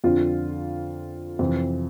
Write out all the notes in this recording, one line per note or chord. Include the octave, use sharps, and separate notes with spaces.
F2 D3 F4
F2 C3 E3